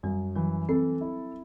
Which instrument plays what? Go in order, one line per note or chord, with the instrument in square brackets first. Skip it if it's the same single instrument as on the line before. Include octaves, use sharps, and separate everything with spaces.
[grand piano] F#2 [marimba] G3
[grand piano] E3 [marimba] F#3
[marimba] C4 [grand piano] A4
[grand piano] E4